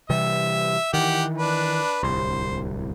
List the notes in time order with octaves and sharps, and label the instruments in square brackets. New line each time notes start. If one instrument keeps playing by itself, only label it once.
[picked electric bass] C3 E3 G3 [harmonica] E5
[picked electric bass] D#3 E3 [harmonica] G4 F#5
[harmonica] D4 B4
[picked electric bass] D1 C2 [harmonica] C5